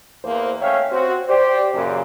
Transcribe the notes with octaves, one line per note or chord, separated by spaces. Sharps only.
E2 A#3 C5
A3 C#4 C#5 E5 F5 G5
C4 F#4
G4 C5 D5
F#2 A#2 C#3